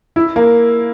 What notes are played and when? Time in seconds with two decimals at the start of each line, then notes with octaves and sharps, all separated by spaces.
0.16 E4
0.36 A#3